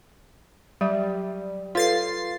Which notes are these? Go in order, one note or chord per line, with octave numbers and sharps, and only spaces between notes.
F#3 G3 E5
F4 A4 B4 C#5 A6 C7